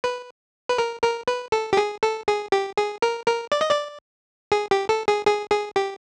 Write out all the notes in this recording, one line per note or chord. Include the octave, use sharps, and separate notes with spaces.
B4
B4
A#4
A#4
B4
A4
G4
G#4
A4
G#4
G4
G#4
A#4
A#4
D5
D#5
D5
G#4
G4
A4
G#4
G#4
G#4
G4